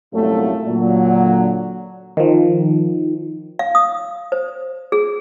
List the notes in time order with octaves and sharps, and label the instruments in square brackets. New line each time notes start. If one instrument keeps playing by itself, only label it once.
[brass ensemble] C2 F#2 A#2 F#3 A3
A#2 D3 F#3
[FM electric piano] D#3 F3
[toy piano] F5
D#6
C5
G#4